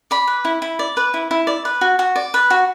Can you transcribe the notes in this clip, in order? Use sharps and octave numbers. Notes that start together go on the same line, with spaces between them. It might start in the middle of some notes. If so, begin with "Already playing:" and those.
D5 B5
B4
E4
E4
D5
B4
E4
E4
D5
B4
F#4
F#4
D5
B4
F#4